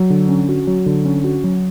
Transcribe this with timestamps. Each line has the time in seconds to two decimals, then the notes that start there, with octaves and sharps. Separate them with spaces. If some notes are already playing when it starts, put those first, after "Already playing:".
Already playing: F#3
0.10 D3
0.29 C#4
0.49 F#4
0.67 F#3
0.86 D3
1.05 C#4
1.24 F#4
1.44 F#3